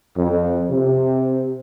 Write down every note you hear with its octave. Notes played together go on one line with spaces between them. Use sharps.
F2
C3